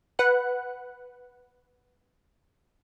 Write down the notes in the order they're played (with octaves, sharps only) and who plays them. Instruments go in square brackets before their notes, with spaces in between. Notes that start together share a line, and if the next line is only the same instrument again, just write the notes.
[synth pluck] B4 F#5 F#6